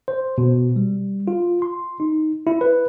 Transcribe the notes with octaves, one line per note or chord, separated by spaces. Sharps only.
C5
B2
G3
F4
C6
D#4
E4
B4